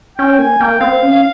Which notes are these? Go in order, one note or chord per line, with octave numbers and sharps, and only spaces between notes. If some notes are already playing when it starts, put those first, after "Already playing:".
C#4 G5
A#3 G#5
A#3 G5
C4 F5
C#4
F5